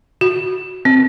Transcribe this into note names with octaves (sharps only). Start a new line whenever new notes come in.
F#4
C4